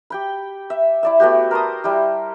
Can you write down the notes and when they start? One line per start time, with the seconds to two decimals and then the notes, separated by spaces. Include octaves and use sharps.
0.10 G4 G5 B5
0.70 E5
1.03 E4 D5 E5
1.20 A3 B3 F#4 G4
1.51 A#4 C5 A5 D#6
1.84 G3 E4 G4